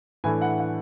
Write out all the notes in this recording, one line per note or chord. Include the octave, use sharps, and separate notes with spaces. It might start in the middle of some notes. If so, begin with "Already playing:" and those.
A2 E3 A3 D4 G#5
F#5
F#5